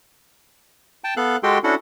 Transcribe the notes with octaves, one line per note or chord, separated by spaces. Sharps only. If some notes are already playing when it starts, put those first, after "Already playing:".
G5 A5
B3 A4 F5 F#6
G#3 F#4 G4 A4 G5 C6
C#4 D4 E4 F#4 A4 F#5